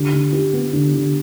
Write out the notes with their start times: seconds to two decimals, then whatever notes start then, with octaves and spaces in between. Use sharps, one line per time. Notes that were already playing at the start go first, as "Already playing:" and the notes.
Already playing: D3 G4
0.13 D3
0.33 G4
0.53 B3
0.73 D3
0.94 D3